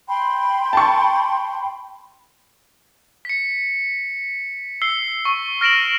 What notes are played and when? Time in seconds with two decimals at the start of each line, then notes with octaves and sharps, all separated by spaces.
0.08 G5 B5 C6
0.73 A5 C#6
3.25 B6 C#7
4.82 E6 C7 G7
5.25 C#6
5.61 F6 A#6 D7 E7 F#7